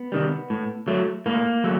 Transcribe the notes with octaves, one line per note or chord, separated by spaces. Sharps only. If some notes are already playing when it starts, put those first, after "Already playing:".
Already playing: B3
C3 D#3 G3
A2
F#3 A3
A2 A#3
F#3 A3